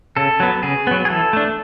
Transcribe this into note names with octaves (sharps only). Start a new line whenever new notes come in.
C#3 A4
F#3 B3
C#3 G#4
F#3 B3
G#4
E3 A4
A3 D4